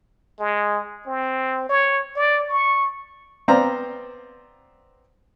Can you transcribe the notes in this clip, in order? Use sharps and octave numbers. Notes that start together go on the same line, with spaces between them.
G#3
C4
C#5
D5
C#6
B3 C4 C5 D5 F5 A#5